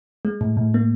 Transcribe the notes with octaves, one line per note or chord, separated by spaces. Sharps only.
G#3
A2
A2
A#3